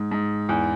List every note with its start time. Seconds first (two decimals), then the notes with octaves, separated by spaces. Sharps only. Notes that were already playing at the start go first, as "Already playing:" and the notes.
Already playing: G#2
0.11 G#2
0.49 E2